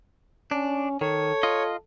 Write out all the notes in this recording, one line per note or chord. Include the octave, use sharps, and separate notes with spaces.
C#4 D4
D#3 A4 C#5
F4 D#5